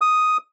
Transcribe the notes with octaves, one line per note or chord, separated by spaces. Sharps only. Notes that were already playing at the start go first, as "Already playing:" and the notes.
D#6